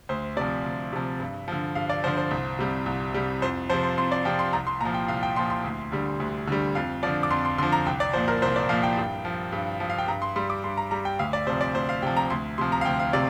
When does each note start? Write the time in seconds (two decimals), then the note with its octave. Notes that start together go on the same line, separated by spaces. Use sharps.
0.09 D2 C5
0.36 C3 F3 D5
0.65 D2
0.93 C3 F3
1.20 G2
1.48 D3 F3
1.75 G2 F5
1.89 D5
2.04 D3 F3 C5
2.17 C5
2.31 C2
2.59 C3 G3
2.86 C2
3.14 C3 G3
3.42 F2 C5
3.70 C3 F3 C5
3.83 C6
3.98 F2 C6
4.12 D5
4.25 C3 F3 G5
4.39 C6
4.53 C2 A#5
4.67 C6
4.81 A#2 F3 A#5
4.94 G5
5.08 C2 F5
5.23 G5
5.36 A#2 C6
5.39 F3
5.50 C6
5.64 D2
5.92 D3 G3
6.20 D2
6.47 D3 G3
6.75 F2 F5
7.03 D3 F3 D5
7.23 D6
7.30 F2 C6
7.45 C6
7.58 D3 C6
7.63 F3
7.72 A#5
7.86 C2 G5
8.00 D5
8.13 F3 C5
8.17 A#2
8.28 A#4
8.42 C2 C5
8.56 D5
8.69 A#2 F3 F5
8.83 G5
8.97 G2
9.25 F3
9.52 G2
9.80 F3
9.90 F5
9.98 G5
10.08 G2 A#5
10.22 C6
10.36 G3 C6
10.50 D6
10.64 G2 C6
10.77 A#5
10.91 G3 A#5
11.05 G5
11.19 D2 F5
11.33 D5
11.47 C3 C5
11.49 F3
11.61 D5
11.74 D2 C5
11.89 F5
12.02 C3 F3 G5
12.17 A#5
12.30 D2 C6
12.58 C3 F3 C6
12.72 A#5
12.81 F5
12.85 D2 G5
12.99 F5
13.13 C3 D5